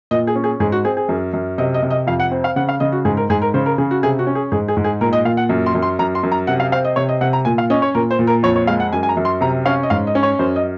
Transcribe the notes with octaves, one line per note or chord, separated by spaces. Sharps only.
A#2 D#5
G#4
C#4
G#4
G#2 G#4
F#4
C4 G#4
G#4
F#2
F#2
C3 D#5
D#5
C3
D#5
F2 F5
F#5
C4
F5
C#3 F#5
F5
C#3 D#5
F#4
G#2 G#4
A#4
G#2 G#4
A#4
C#3 C5
A#4
C#3 G#4
F#4
C3 G#4
F#4
C#4
G#4
G#2 G#4
G#4
G#2
G#4
A#2 A#4
D#5
A#2 F5
F#5
F#2
C6
F#2
C6
F#2 A#5
C6
F#2
A#5
C3 F#5
F5
C4 F5
D#5
C3 C#5
D#5
C3 F#5
A#5
A#2 G#5
F5
C#4 D#5
C#5
A#2 A#4
C5
A#2
A#4
F2 C#5
C#5
G#3 F5
F#5
F#2 G#5
G#5
A#5
F#2
C6
C3 A#5
C#4 F5
D#5
G#2 F5
D#5
C#4
C#5
F#2 C5
D#5